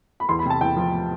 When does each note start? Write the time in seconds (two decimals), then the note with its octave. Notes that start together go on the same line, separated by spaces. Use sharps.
0.20 B5
0.29 E2 C6
0.39 B5
0.46 C3 A5
0.61 E2 G5
0.76 F3